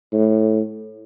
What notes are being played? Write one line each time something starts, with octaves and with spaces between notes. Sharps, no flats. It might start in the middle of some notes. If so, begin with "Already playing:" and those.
A2